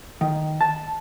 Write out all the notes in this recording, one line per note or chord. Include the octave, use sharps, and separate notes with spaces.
D#3
A5